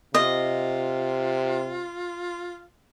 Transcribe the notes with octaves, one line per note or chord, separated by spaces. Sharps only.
C3 F4 D#5